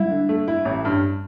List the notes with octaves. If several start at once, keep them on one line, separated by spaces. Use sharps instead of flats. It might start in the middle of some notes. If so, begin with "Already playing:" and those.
Already playing: G3 E4
D3
A3
E4
A1
G2